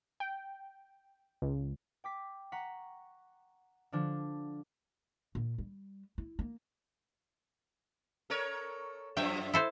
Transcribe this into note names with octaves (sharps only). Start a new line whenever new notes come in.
G5
C#2
G5 D6 B6
F#5 A#5 C#6 B6
D3 F3 D4
A#2
G3
E4
A#3
A4 A#4 C#5
F#2 F3 E5 G5
E4 A4 C5